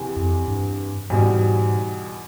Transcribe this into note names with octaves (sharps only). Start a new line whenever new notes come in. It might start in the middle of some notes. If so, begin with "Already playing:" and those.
Already playing: E2 C3 E3
F2
G2
E2 G#2 B2 G3